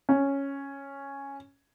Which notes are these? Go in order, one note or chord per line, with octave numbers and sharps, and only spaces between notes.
C#4